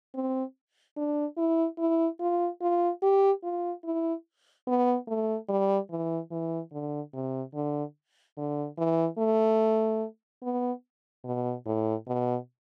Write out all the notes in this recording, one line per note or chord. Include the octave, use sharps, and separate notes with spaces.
C4
D4
E4
E4
F4
F4
G4
F4
E4
B3
A3
G3
E3
E3
D3
C3
D3
D3
E3
A3
B3
B2
A2
B2